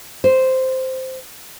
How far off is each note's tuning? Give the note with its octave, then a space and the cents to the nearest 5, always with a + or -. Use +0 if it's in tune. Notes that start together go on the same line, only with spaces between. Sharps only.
C5 -5